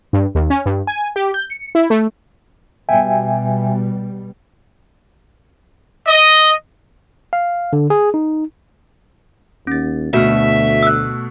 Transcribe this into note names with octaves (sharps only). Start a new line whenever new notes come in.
G2
D#2
C#4
G2
G#5
G4
G6
C#7
E4
A3
B2 G3 E5 G5 G#5
D#5
F5
D3
G#4
D#4
D#2 C#4 A6
D2 B2 A3 F#4 E5 F6
E6 F#6